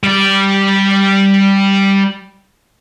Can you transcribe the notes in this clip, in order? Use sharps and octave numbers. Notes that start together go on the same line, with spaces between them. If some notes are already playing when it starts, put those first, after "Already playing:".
G3 D5